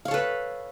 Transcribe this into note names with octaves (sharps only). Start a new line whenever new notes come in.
A4 B4 C#5 F5